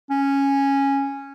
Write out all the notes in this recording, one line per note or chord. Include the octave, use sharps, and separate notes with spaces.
C#4